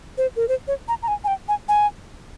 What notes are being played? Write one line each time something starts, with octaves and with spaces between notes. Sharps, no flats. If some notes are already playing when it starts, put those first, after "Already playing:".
C5
A#4
C5
C#5
A#5
A#5
G#5
G#5
G5
G#5
G#5